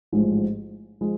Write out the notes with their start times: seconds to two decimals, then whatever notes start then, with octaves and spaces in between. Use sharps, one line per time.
0.12 A1 G#2 F3 G#3
1.01 F3 G#3